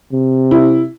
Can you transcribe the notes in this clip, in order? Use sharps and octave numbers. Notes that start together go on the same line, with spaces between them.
C3
E4